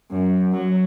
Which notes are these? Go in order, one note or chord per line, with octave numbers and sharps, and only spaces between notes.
F#2
F#3